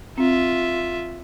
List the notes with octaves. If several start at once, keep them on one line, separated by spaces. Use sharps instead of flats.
C4 F4 E5